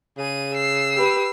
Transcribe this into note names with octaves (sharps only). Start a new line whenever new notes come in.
C#3 G#4 D#7
E6 C7
G4 B4